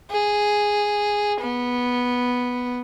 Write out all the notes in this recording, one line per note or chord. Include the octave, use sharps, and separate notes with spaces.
G#4
B3